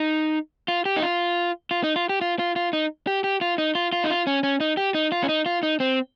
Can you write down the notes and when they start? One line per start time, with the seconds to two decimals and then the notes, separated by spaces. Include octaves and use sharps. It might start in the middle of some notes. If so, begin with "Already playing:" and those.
Already playing: D#4
0.68 F4
0.85 G4
0.96 D#4
1.02 F4
1.71 F4
1.83 D#4
1.96 F4
2.09 G4
2.21 F4
2.39 F4
2.56 F4
2.73 D#4
3.07 G4
3.24 G4
3.41 F4
3.58 D#4
3.75 F4
3.93 F4
4.04 D#4
4.10 F4
4.27 C#4
4.43 C#4
4.60 D#4
4.77 G4
4.94 D#4
5.12 F4
5.23 C#4
5.29 D#4
5.46 F4
5.63 D#4
5.80 C4